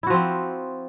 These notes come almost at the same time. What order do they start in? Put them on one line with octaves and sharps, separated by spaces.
E4 F#4 F3 C4